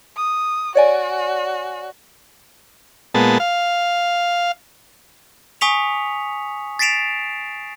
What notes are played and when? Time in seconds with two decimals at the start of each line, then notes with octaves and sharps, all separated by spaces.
0.16 D#6
0.75 F#4 C#5 D5 G#5
3.15 A#2 G#3 B3 A5
3.40 F5
5.61 G#5 C#6 D#6 B6 C#7 F7
6.79 A6 B6 C7 D7 E7 F7